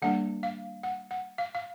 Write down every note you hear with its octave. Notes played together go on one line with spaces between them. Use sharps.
D#3 G3 A#3 D4 F#5
F5
F#5
F#5
F5
F5